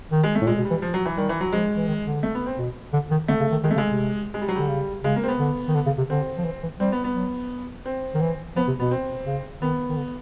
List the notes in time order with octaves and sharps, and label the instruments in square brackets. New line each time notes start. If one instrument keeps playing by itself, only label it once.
[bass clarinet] D#3
[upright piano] G#3
A3
[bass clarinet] A2
[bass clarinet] A#2 [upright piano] G#3
[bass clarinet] B2
[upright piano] G3
[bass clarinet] E3
[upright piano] F3
F#3
E3
[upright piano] D#3 [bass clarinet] G3
[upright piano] E3
F#3
[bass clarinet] F3 [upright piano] G#3
[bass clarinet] E3
D#3
D3
[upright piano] A3
B3
C4
[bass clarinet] B2
D3
D#3
[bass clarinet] D3 [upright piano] A3
[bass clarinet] C#3
D#3
[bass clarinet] D#3 [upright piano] G#3
[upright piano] A3
[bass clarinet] C#3 [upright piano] G#3
[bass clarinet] C3
[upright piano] G#3
G3
F#3
[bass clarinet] D3 [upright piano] G3
[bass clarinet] C#3
[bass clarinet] C#3 [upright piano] G#3
[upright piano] A#3
C4
B3
[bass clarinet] D3
D#3
D3
C#3
C3
[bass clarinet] D3 [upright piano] C4
[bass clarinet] F3
E3
E3
[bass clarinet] G3 [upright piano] C4
[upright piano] B3
B3
[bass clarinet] F#3
[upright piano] C4
[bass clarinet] D#3
E3
[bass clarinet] F3 [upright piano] B3
[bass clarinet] C3
[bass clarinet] B2 [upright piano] B3
[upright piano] C4
[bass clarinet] C#3
[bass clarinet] D#3 [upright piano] B3
[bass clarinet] D#3
D3